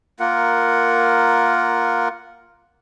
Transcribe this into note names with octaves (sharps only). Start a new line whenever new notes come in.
A#3 F4 A#4 F#5